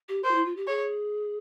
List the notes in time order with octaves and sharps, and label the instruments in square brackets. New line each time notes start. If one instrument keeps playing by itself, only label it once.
[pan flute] G4
[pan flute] A#4 [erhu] C5
[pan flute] F4
E4
F4
G4
[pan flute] G#4 [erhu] C#5